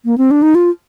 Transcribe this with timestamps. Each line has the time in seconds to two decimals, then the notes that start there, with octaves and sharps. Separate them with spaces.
0.05 A#3
0.18 C4
0.31 D4
0.42 D#4
0.55 F4